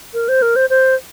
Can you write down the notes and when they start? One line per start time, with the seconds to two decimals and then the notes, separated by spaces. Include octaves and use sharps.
0.14 A#4
0.29 C5
0.42 A#4
0.56 C5
0.70 C5